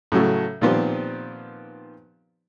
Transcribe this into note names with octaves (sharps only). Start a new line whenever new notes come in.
A2 C#3 F#3 A3
A#2 D#3 F3 B3 C4 G4